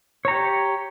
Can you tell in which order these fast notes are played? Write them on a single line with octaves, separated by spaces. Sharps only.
C#5 A#5 G4